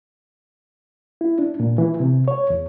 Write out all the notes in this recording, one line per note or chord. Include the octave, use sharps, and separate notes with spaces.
E4
D4
A#2
E3
C3
C#5
E2